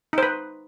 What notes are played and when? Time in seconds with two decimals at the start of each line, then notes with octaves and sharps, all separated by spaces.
0.13 D#4
0.18 C5
0.23 B4